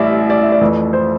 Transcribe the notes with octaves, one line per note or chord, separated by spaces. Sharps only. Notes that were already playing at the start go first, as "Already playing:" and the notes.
Already playing: A1 A2 G3 D5 E5
D5
E5
D5
F2 E3 A3
C5